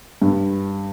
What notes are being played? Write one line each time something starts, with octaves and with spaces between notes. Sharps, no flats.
G2